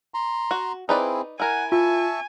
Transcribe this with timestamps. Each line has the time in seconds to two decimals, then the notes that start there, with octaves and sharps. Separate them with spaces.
0.14 A#5 C6
0.51 F#4
0.89 C4 D#4 E4 G#4 B4 D5
1.40 E4 A#4 F#5 G#5
1.72 F4 E5 G#5 A5 C#6